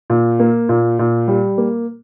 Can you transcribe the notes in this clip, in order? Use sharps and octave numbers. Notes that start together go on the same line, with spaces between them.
A#2
A#3
A#2
A#2
G3
A#3